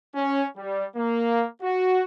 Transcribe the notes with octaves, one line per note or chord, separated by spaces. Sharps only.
C#4
G3
A#3
F#4